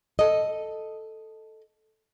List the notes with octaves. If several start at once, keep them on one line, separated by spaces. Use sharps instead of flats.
A4 D#5